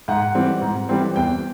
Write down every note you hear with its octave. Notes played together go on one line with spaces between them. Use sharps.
G#2 F#5
E3 G3 C4
G#2
E3 G3 C4
E2 G5